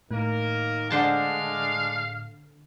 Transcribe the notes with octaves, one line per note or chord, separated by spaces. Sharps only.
A2 D#3 A#3 A#4
D3 G#3 D4 C5 F5 A5